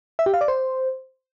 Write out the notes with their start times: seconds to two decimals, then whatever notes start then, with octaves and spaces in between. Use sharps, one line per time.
0.19 E5
0.26 G4
0.34 F5
0.41 D5
0.48 C5